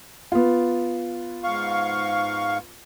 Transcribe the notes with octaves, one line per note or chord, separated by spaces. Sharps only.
B3 F4
G#2 F5 C#6